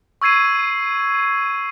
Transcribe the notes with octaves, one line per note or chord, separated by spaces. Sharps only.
C#6 E6 G#6 C7 D#7